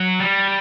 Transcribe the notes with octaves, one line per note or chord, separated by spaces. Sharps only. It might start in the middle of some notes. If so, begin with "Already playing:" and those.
Already playing: F#3
G3